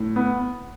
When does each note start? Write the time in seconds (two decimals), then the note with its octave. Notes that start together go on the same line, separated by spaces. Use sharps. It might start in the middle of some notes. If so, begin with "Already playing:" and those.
Already playing: A2
0.16 B3